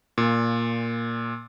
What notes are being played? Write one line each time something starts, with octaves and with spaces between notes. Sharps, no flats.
A#2